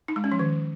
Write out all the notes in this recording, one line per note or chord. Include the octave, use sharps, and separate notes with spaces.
D#4
G#3
C#4
F3
D#3